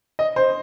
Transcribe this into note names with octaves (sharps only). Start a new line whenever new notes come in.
D#5
C5